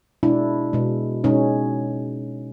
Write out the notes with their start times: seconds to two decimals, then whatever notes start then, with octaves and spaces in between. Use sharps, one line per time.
0.23 B2 G#3 D4 E4
0.73 B2 G#3
1.24 B2 G#3 C#4 D#4